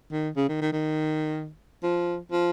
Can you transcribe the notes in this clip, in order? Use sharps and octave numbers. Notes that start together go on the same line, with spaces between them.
D#3
C#3
D#3
D#3
D#3
F3
F3